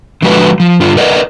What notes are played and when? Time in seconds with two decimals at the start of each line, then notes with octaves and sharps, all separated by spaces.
0.22 D3 F3 G#3 F#4 A4 B4
0.60 F3
0.80 G2 D3 F4
0.97 A#4 B4 D5 D#5